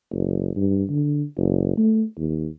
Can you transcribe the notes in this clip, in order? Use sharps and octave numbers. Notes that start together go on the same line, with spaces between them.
F#1
G2
D3
F#1
A3
D#2